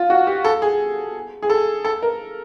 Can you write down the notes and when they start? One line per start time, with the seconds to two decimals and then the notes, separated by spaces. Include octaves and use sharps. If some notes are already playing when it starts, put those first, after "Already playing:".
Already playing: F4
0.10 F#4
0.27 G4
0.44 A4
0.62 G#4
1.42 G#4
1.50 A4
1.85 A4
2.02 A#4